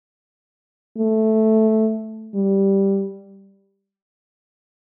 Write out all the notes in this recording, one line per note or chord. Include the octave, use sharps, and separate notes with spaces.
A3
G3